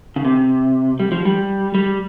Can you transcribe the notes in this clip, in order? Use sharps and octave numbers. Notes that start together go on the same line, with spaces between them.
C#3
C3
G3
F3
G3
G3